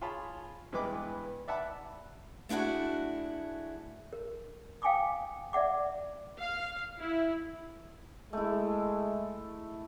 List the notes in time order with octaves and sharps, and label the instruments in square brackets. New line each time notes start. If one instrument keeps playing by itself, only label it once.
[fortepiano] F4 G#4 C#5 A5 B5
G2 E3 G#3 B3 B4 D6
D5 E5 F#5 A5 B5 D6
[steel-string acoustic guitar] A3 D4 E4 F#4 G#4
[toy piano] A#4
F5 G5 G#5 C6 D6 D#6
D5 E5 F#5 D6
[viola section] F5
E4
[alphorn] G#3 [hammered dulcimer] A3 E4